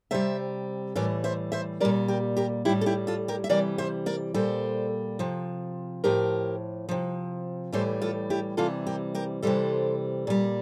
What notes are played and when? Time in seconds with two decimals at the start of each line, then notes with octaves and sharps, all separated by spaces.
0.11 C3 G3 C5 E5
0.95 A2 E3 G3 A#4 D5
1.24 C5 E5
1.52 C5 E5
1.80 A#2 G3 A#4 D5
2.08 G4 A#4
2.37 G4 A#4
2.65 G3 E4 G4
2.69 A2
2.81 A4
2.86 E4 G4
3.07 F4 A4
3.28 G4 A#4
3.44 E5
3.49 C3 E3 G3 A#4 D5
3.78 C5 E5
4.06 A#4 D5
4.34 A#2 G3 A4 C5
5.19 C3 F3
6.04 A2 F3 G4 A#4
6.89 C3 F3
7.72 A2 E3 G3 A4 C5
8.02 F4 A4
8.30 E4 G4
8.57 C3 E3 G3 F4 A4
8.87 G4 A#4
9.15 G4 A#4
9.42 C3 E3 G3 A4 C5
10.27 A#2 G3